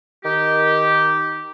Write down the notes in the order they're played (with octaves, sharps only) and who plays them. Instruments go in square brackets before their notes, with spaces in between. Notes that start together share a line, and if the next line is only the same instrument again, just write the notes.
[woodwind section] D#3 G4